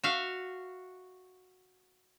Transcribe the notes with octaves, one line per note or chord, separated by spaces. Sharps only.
F#4 E5 F5